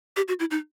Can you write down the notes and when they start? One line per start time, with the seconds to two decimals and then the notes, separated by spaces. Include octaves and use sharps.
0.17 G4
0.28 F#4
0.40 E4
0.51 D#4